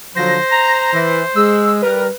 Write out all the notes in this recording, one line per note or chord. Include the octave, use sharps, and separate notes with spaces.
D3 F3 F#3 C5 A#6
A#5
E3
G#3 E6
G3 A#4 B4